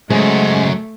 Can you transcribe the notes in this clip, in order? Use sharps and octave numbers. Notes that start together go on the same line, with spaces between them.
F#2 C#3 G#3 A3 C5